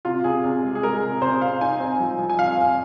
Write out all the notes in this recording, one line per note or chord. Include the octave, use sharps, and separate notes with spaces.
C3 F4
C3 G#4
C3
G#3
G#4
G#3 A#4
C3
C3 C5
C3 F5
D#4 G#5
C4
F3
F3
G#5
F2 F5
C4